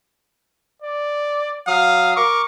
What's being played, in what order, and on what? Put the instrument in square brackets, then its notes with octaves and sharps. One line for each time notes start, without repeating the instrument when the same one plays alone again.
[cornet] D5
[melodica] F#3 D#6 [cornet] F5
[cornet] A#4 [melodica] C#6 D6